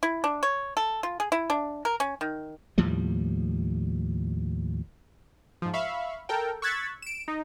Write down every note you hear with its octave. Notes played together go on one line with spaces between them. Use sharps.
E4
D4
C#5
A4
F4
G#4
E4
D4
A#4
C#4
D#3
D#2 A2 F3 G3
G#2 F3
E5 F5 B5 C#6
A4 A#4 G5
C#6 E6 F#6 G#6 A6 B6
D7 E7
D#4